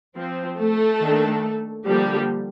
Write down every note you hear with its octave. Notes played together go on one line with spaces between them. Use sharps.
F3 C4
A3 A4
D#3 A#3 D4
D3 F3 G3 A#3 G4